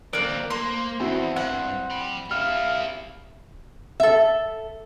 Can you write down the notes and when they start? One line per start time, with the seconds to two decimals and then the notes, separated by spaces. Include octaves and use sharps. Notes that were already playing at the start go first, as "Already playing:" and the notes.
0.13 D3 A#3 C4 D5 F#6
0.50 A#3 C5 C6
1.00 E2 C4 E4 F#4
1.36 G2 F#5
1.91 G5 B5
2.31 G3 E4 F5 F6
4.00 A4 E5